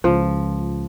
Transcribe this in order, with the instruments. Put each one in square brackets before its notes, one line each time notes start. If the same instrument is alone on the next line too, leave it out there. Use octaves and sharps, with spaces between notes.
[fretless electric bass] C#2 [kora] F3